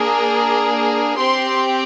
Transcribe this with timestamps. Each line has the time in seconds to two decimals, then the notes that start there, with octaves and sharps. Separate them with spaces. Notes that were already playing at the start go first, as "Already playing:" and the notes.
Already playing: A#3 D4 G#4
1.17 C4 G4 C6